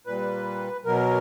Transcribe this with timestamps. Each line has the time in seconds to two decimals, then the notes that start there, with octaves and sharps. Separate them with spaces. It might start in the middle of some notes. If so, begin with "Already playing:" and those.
0.07 A#2 G3 B4
0.85 B2 F#3 A#4